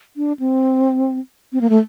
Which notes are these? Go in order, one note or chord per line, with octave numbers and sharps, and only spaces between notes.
D4
C4
C4
A#3
A3